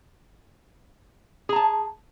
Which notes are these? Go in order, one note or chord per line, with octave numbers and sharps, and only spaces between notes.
G#4 A5 A#5